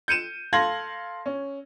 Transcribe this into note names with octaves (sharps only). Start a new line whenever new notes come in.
G6 C#7 D#7 E7
A4 F5 C6 G#6 A#6 F#7
C#4